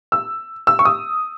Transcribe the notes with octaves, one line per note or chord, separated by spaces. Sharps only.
E6
E6
C#6
D#6